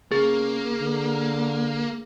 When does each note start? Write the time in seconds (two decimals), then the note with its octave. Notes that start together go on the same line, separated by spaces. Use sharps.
0.12 C#3 A#3 G#4
0.80 D3